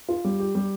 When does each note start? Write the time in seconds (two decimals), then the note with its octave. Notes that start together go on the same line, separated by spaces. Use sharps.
0.09 F4
0.24 G3
0.39 G4
0.55 G3